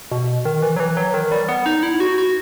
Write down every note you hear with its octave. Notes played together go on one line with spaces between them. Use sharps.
B2
D#3
E3
F#3
E3
F#3
D#3
G3
B3
D#4
E4
F#4
F#4